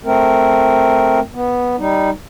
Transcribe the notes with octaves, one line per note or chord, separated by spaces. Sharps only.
A3 C4 A#4
B3
G3 D#4